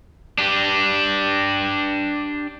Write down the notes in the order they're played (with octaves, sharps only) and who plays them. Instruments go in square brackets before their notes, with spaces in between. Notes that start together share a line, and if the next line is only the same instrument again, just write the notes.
[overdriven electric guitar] D4 G4